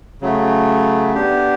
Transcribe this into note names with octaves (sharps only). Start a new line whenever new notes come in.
C#3 F#3 A3
B3 D4 G4